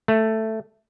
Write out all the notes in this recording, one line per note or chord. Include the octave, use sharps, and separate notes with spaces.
A3